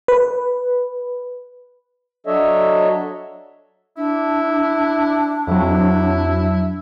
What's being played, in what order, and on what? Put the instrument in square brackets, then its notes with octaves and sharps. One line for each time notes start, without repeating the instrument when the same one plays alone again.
[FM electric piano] B4
[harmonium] F#3 D4 A4 C#5 D#5 E5
[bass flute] D4 [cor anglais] E4
[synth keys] F2 F#3 [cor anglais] E4